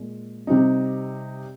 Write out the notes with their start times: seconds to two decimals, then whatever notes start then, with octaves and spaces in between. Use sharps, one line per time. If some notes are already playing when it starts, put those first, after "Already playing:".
Already playing: A#2 G#3 G#4
0.47 C3 G3 C4 D#4